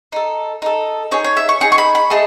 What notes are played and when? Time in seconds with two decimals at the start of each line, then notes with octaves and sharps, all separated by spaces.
0.12 D#4 A4
0.62 D#4 A4
1.11 D#4 G#4 C#5
1.24 C#5
1.37 E5
1.49 C#6
1.61 D#4 G#4 C#6
1.72 C#6
1.78 B5
1.95 B5
2.10 A3 D#4 G#4 A5